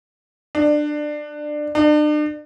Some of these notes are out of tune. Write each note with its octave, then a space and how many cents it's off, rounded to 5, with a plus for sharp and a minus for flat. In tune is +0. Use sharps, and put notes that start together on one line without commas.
D4 +20
D4 +40